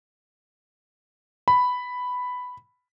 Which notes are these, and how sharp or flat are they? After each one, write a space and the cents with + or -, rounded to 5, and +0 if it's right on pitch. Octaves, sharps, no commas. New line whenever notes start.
B5 +5